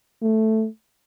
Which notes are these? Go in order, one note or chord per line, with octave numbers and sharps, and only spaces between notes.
A3